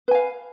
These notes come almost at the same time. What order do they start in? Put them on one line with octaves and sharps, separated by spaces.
B4 G#5 F5